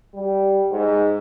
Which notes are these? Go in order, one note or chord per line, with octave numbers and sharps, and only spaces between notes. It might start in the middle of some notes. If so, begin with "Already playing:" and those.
G3
G#2